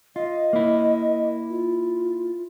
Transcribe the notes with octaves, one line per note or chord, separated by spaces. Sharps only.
F4 D#5
A#3 E4
F4